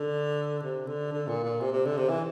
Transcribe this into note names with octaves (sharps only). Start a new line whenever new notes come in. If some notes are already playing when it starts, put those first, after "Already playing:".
Already playing: D3
C3
D3
D3
A#2
A#2
C3
C3
D3
C3
E3